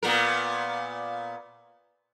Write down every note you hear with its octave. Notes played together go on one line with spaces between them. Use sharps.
A#2 B3 A#4